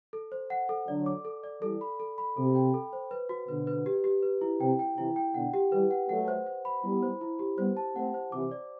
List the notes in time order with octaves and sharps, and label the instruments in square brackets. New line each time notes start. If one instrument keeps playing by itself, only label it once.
[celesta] A4
C5
F#5
A4
[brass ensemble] D3 F#3 [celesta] D5
[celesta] D6
A4
D5
[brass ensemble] E3 G3 [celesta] A4
[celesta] B5
A4
B5
[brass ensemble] C3 [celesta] A4
[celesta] G5
A4
C5
B4
F#4
[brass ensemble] B2 D3 [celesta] B4
[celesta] B4
G4
G4
B4
E4
[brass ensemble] C3 [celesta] G5
[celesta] G5
[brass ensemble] C3 E3 [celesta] E4
[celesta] G5
[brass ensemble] B2 D3 [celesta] F#5
[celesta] G4
[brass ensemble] E3 G3 [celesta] B4
[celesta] F#5
[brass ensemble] F#3 A3 [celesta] F#5
[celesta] C5
C5
B5
[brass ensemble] G3 B3 [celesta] E4
[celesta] C5
E4
G4
[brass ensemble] G3 B3 [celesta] C5
[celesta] A5
[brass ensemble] A3 C4 [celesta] F#5
[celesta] C5
[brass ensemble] C3 E3 [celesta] D6
[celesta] D5